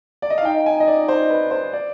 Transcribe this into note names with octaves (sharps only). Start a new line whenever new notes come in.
D5
D#5
F5
D#4 G5
G#5
D#5
D5
C5
B4
C5
D5